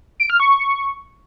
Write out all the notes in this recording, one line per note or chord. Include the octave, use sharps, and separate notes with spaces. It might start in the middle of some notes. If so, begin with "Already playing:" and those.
D7
F6
C#6